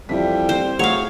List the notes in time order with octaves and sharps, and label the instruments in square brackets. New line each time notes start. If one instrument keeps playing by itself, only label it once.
[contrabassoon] F2 [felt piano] E3 E4 B6 [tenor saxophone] G3
[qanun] C5
[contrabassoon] F#3 [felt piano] A3 F#4 G#4 [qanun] C#5 F5